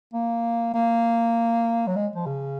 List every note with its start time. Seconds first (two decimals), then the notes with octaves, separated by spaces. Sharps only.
0.14 A#3
0.74 A#3
1.87 F#3
1.96 G#3
2.15 F3
2.26 C#3